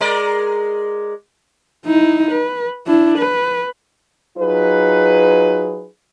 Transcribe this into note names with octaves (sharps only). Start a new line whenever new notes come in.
G#3 A#4 D5
D#4 E4
B4
D4 E4
B4
F#3 D#4 F4 G#4 B4